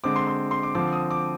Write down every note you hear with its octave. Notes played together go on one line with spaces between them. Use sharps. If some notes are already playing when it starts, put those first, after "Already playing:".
D3 G#3 C4 D6
C6
C6
C6
D6
D3 F3 C4 D6
D#6
D6